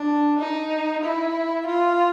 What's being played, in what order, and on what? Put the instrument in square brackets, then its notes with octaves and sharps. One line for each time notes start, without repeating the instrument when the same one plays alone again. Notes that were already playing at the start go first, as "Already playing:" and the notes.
Already playing: [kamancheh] D4
D#4
E4
F4